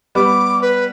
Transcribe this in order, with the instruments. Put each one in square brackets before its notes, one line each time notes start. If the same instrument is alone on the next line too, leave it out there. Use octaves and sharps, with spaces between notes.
[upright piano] G3 B3 [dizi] D6
[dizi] B4